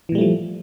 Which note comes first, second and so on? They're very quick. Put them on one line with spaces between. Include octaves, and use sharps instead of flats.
E3 A#2 G3 A3 F3